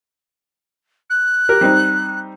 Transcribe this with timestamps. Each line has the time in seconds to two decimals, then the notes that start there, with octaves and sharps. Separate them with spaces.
1.10 F#6
1.49 G4 A#4
1.61 G3 C4 D#4